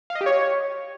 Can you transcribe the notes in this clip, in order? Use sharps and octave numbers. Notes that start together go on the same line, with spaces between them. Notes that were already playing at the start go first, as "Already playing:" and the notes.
F5
D#5
G4
C#5